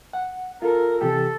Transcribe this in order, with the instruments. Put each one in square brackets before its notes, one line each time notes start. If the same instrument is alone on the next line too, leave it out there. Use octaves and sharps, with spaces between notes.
[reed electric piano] F#5
[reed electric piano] F4 A4 [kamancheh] A#4
[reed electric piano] C3 E3 G4 [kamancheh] A4